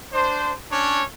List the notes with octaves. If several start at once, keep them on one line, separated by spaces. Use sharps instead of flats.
D4 C5
C#4 D4 C#5